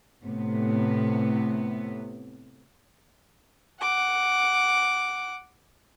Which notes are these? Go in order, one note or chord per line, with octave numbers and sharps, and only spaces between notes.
A2 C3 B3
F#5 D6